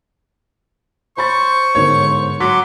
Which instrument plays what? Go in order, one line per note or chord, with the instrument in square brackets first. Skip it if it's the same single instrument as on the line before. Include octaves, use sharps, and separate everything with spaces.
[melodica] C5 [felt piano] C#5 B5 A6 [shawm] C#6
[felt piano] G1 G#2 A#4 [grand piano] C#5
[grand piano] F#3 [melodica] F#5 C6 D6 [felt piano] B6